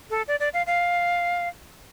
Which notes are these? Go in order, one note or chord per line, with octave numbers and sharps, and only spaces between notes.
A4
D5
D5
F5
F5